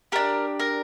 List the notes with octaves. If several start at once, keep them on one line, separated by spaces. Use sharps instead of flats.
D4 G4 A#4
A#4